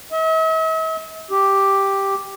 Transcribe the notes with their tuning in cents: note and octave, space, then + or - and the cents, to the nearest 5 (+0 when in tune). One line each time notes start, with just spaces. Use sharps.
E5 -45
G4 +0